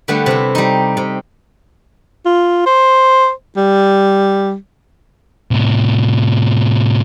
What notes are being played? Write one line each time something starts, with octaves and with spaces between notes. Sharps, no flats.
D3 G3 A3 B3 A5
C3 E4
G3 D#4
C3
F4
C5
G3
A2 C3